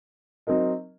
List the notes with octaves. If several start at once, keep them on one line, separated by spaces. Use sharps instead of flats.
F#3 C4 D#4 A#4 D#5